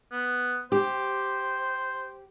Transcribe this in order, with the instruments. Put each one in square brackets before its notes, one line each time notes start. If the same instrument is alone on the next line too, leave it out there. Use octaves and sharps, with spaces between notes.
[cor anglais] B3
[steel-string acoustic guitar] G4 [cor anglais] C5